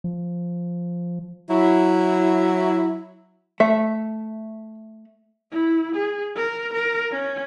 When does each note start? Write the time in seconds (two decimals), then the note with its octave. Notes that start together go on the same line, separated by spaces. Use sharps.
0.04 F3
1.49 F#3 E4
3.60 A3 E5
5.51 E4
5.95 G#4
6.36 A#4
6.73 A#4
7.12 C#4